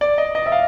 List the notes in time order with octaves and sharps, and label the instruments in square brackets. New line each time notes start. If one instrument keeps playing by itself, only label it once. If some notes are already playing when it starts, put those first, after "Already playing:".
[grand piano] D5
D#5
D#5
E5
F5